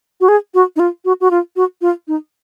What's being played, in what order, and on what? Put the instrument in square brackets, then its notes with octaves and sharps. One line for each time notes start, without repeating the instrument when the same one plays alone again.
[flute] F#4
G#4
F#4
D#4
F4
F#4
F#4
F4
F#4
F4
D#4